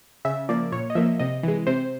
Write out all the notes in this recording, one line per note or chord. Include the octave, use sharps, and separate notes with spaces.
C#3 E5
F3 A#3 D5
A#2 C#5
D#5
F3 A#3 E5
C3 D#5
E3 G#3
C3 C5